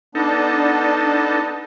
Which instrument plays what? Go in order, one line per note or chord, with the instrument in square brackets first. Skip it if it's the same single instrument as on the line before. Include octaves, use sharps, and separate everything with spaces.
[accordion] B3 D4 [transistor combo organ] D#4 A4